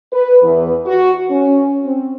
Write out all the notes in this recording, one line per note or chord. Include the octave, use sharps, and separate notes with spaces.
B4
E2
F#4
C#4
C4